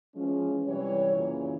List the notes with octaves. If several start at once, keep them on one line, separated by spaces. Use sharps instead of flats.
E3 F3 G#3 C#4
C3 E3 G3 C#5
F#2 A#2 C#3 E3